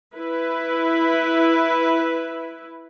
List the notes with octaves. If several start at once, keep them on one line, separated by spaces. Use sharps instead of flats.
E4 B4